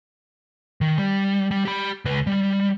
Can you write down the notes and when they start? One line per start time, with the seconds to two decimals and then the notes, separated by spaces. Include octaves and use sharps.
0.81 D#3
0.98 G3
1.51 G3
1.65 G4 B5
2.05 C#2 B4
2.27 G3